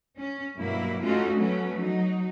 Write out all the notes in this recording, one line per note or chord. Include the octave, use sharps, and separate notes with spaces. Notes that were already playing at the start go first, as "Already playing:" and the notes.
C#4
G2 B2 F#3 A#3 E4
A3 C#4 D#4 F4 F#4
F#3 A3 B3 C#4
F#3 D#4